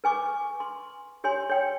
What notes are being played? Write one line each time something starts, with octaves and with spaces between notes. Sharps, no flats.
B4 G#5 C#6 D6
C6
G4 C#5 G#5 C6
C#5 G5